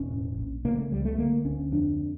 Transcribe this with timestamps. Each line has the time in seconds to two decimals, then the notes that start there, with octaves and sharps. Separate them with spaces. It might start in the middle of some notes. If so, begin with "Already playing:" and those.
Already playing: E1 C#4
0.11 A2
0.38 A#1
0.65 C#3 A#3
0.78 A3
0.91 C#2 G3
1.05 A3
1.18 D3 A#3
1.45 D2 C#4
1.71 F2 D4